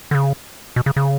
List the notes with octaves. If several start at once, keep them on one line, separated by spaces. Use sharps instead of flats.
D3
C#3
B2
C#3
C#3